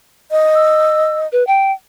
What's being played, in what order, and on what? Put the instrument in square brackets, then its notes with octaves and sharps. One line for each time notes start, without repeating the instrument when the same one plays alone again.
[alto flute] D#5
[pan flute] E6
B4
G5